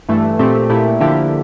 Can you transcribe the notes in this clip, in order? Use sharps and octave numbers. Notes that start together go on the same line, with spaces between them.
G2 E3 A3
A#2 A3 C4 G4
A#2 A3 E4 G4
D3 F3 A#3 E4 G4